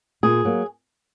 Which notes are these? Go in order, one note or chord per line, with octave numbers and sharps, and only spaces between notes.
A#2 G#4
F#3 A#3